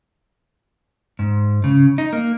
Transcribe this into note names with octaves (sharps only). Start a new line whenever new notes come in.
G#2
C#3
D#4
A#3